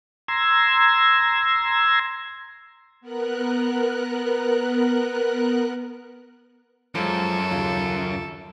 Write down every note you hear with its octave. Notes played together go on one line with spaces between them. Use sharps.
A#5 C6 E6 G#6
B3 A#4 F#6
F#2 F3 G#3 A4
D#2 C#3 F4